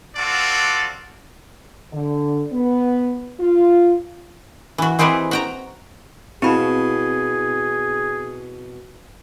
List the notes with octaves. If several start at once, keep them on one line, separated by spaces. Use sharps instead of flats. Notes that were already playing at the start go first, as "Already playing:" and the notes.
C4 D4 F4 F#4 A4 D5
D3
B3
F4
E3 F#4
E3 C4 D#4 G4 G#4 B4
F#4 G5 A#5
B2 C4 E4 G#4 B5